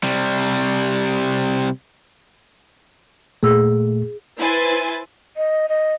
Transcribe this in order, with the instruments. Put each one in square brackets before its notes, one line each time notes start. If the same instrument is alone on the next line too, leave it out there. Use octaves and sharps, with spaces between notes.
[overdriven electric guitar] C3 G3
[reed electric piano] A#2 A3 [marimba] G#4 E6
[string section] E4 B4 C5 G#5 A6
[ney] D#5
D#5